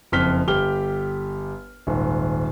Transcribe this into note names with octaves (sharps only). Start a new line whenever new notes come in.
F#1 F2 F6 B6 G7
G1 G4 F6 G7
D#1 G#1